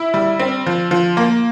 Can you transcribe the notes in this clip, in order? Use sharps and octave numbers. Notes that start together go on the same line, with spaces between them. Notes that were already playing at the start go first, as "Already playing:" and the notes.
Already playing: E4
G3
C4
F3
F3
A#3